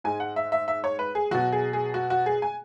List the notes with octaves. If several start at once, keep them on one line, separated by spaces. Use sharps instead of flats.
G#2 G#3 G#5
F#5
E5
E5
E5
C#5
B4
G#4
B2 F#3 F#4
G#4
G#4
F#4
F#4
G#4
G#5